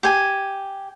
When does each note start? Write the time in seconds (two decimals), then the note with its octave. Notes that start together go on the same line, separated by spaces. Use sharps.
0.03 G4 G#5